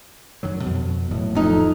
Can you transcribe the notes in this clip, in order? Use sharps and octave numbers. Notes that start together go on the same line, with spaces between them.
F#2 D#3 F#3
F2 B2
D#1 A2 F#3
F2 D#4